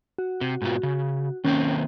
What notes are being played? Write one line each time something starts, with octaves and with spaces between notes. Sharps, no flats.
F#4
C3
G#2 B2 F4
C#3
D#3 A#3 C4 C#4